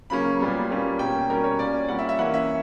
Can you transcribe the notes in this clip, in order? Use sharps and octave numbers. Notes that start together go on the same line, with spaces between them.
C#3 F#3 A#3 C#4 B5
A#2 G3 B3
A#2 G3 A#3 C#4
B2 A#3 C#4 G5
B2 G3 C#4 A#4
C#5
A#2 A#3 C#4 D5
A#2 G3 C#4 F#5
E5
E5
E3 A#3 C#4 F#5
E5